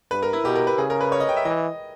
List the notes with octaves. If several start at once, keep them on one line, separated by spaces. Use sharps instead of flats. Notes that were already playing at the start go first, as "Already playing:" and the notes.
G2 B4
A#4
E4
B2 G4
A#4
B4
C#3 G#4
A#4
B4
C#5
D#5
G5
E5
E3 D#5